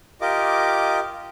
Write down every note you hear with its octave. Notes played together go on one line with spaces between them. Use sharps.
F4 G4 A#4 D#5 D6